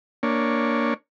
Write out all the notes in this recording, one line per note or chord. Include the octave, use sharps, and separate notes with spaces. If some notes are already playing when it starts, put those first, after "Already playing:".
A#3 D4 C#5